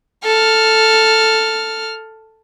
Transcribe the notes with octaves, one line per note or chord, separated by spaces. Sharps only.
A4 F6